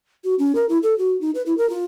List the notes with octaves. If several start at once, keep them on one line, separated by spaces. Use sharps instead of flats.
F#4
C#4
A#4
E4
A4
F#4
D#4
B4
E4
A#4
F4